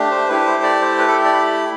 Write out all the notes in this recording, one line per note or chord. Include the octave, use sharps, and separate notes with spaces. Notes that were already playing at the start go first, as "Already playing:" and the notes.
Already playing: A3 D4 G4
C5
A3 E4 G4 B4
C5
D5
C5
B4
A4
D5
B5